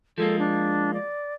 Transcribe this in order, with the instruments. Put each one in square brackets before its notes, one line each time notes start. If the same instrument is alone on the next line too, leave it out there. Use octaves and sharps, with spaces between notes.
[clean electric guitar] F3 G#3 A#3 [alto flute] A4
[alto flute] D4
D5